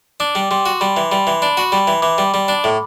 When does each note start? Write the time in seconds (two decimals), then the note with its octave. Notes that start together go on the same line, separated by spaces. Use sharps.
0.20 D4 D6
0.35 G3
0.51 G3 C6
0.66 F#4
0.81 G3 B5
0.97 E3
1.12 G3 B5
1.27 E3
1.42 D4 B5
1.57 F#4
1.72 G3 B5
1.87 E3
2.02 E3 D6
2.18 G3
2.34 G3
2.48 D4
2.64 A2